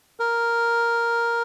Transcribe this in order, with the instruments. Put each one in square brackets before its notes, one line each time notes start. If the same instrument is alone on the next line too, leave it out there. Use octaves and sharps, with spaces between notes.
[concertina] A#4